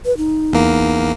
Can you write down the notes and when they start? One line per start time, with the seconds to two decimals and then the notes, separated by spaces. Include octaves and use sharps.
0.05 B4
0.17 D#4
0.53 E2 A#3